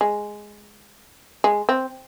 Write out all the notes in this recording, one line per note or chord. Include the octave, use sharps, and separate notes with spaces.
G#3
G#3
C4